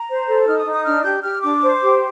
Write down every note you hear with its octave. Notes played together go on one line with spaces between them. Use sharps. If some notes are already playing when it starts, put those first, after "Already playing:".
Already playing: A#5
C5
A4
D#4 F6
D#6
D#4
D#6
D4 F6
G4 G6
G4 F6
D4 D6
C5
G4